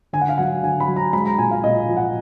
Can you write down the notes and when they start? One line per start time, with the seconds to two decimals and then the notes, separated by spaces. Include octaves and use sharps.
0.13 D3 G#5
0.21 F#5
0.29 F5
0.38 F#3 F#5
0.63 D3 G#5
0.80 B5
0.88 F#3
0.96 A#5
1.13 G#3 B5
1.25 A#5
1.38 A#2 G#5
1.51 F5
1.64 A#2 D#5
1.88 F3
1.97 F#5